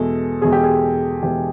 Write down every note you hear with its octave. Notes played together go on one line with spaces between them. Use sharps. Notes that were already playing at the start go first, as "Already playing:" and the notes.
Already playing: E2 B2 G#3 A4
E2 B2 G#3 G#4
G4
G#4
E2 B2 G#3 G4